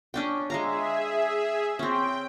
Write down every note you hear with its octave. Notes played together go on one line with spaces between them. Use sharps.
C#4 D4 G5
G#3 G#4 E5 F5 A#5
C4 C#4 G5